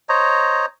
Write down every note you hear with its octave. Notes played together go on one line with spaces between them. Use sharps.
C5 C#5 D#5 A#5